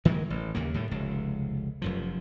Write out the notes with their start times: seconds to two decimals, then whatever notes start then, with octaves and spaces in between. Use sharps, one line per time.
0.05 D#3 F#3 G#3 A#3
0.30 A1
0.55 D#2 C#3 A#3
0.74 A2 D#3 G3
0.91 F1 C#2
1.82 F1 F#2 F3